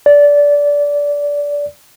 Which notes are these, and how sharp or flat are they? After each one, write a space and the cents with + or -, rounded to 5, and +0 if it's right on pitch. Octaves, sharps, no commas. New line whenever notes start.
D5 -20